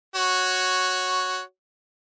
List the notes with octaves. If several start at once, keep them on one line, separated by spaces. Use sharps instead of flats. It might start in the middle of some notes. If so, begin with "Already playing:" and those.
F#4 C#5